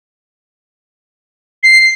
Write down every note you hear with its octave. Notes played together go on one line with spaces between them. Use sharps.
C7